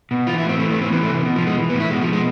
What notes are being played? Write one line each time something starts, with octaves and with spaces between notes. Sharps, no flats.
B2
E3 F4
E4
A2
C4
E3 A3
A3
A2
C4
E3 B3
A3
C3
B2
F3
B2
G#3
E3
B3
A2
E4
B2 G#3
F3
B2
G#3